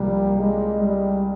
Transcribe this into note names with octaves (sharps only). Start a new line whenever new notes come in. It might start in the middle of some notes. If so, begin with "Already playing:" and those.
Already playing: C2 C3 F3 G3 A#3
G#3
G3